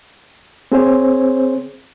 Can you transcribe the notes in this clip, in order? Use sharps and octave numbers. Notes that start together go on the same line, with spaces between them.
C4 G#4 C5 C#5